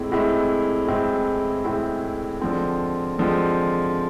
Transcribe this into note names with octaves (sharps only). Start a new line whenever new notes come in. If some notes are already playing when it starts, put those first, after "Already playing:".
Already playing: A2 G#3 C4 E4
A2 G#3 C4 E4
A2 G#3 C4 E4
A2 G#3 C4 E4
D3 F3 G#3 C4
D3 F3 G#3 C4